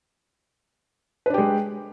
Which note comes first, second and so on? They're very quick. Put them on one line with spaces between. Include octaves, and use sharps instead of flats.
B4 D4 G4 G#3